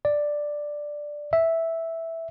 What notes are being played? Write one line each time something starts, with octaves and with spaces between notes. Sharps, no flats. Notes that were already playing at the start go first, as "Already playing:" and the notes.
D5
E5